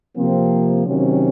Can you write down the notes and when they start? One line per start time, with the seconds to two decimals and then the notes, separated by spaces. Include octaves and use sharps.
0.16 C3 F3 A#3 C4
0.86 C3 D#3 F#3 C4 C#4